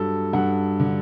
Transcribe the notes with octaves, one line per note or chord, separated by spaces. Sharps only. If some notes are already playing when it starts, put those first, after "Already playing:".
Already playing: G2 F#3 A4
G2 F#5
D3